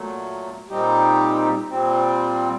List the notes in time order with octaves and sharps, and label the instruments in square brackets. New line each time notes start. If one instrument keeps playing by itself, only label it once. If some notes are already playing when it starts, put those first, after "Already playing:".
Already playing: [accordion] A#2 F#3 A3
A#2 G3 C4 D#4 G4
A#2 G3 C4